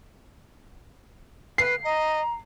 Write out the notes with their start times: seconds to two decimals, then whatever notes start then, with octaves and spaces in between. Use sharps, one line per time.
1.58 B4 C7
1.84 D#5 A#5